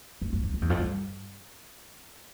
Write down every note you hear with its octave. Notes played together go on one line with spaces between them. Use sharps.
F2
F2
E2
F2
E2
F2
G2